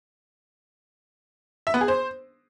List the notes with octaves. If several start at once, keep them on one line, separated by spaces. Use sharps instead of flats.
E5
B3
G#4
C5